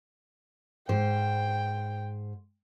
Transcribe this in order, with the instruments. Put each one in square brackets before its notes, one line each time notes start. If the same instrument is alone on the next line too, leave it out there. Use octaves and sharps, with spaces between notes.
[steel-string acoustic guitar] G#2 C5 [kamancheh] G5